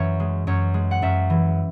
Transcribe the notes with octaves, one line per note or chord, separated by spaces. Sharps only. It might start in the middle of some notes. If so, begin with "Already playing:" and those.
Already playing: F#2 E3 C#5 E5
G#3
F#2 C#5
G#3
F#5
F#2 E5
E3